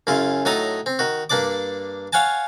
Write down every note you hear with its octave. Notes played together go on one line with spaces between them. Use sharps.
F#2 C#3 E4 F4
A2 F#3 D#4 A4 A#5 D#6
C4
D#3 F#4
G2 A#3 D4 D5 D6
C#5 F5 F#5 G#5 A5